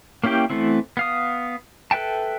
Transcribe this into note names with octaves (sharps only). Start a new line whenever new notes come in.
A#3 C#4 E4 G4 G5
E3 A3 B3 C4 E4
B3 F5 D#6
A4 B4 E5 G5 A5